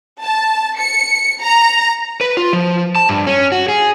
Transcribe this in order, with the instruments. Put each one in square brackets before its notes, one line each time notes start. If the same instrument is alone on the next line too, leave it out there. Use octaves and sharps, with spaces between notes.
[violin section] A5
C#7
A#5
[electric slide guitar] B4
F4
F3
A5
G2
C#4
F#4
G#4